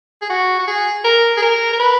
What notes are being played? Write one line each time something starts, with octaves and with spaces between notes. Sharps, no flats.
G#4
F#4
F#4
G#4
A#4
G#4
A#4
A#4
B4